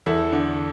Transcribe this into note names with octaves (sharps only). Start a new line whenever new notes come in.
E2 E4 A4
D3